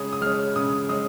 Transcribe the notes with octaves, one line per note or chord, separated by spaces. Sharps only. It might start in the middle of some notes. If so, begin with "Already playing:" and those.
Already playing: C#3 G#3 C#4 D#6
D#6
G#3 C#4 F6
C#3 D#6
G#3 C#4 D#6